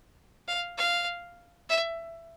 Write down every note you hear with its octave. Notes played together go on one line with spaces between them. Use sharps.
F5
F5
E5